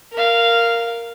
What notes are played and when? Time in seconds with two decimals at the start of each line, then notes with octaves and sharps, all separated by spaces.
0.13 A#4 F5